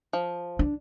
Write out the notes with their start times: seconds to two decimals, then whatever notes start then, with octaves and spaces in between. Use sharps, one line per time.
0.13 F3
0.59 D4